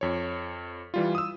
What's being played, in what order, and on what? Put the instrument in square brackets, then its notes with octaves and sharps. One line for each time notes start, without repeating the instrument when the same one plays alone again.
[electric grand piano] F2 C#5
E3 G3 F4
D#6 E6